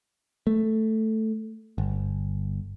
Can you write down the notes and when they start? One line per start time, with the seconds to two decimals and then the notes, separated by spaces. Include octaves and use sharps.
0.47 A3
1.78 G1